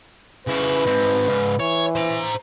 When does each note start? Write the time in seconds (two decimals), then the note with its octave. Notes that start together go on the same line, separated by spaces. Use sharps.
0.47 C#3 E4 B4
0.87 G#2 C4
1.28 G#2 C#3
1.60 E3 C#5
1.95 C5 A#5